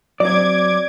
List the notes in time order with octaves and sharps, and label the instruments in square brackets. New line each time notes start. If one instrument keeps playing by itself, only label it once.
[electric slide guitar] F#3 C4 [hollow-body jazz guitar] D5 [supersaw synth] D6 G#6